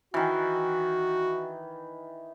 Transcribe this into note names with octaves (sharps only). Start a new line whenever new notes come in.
D#3 E3 F#4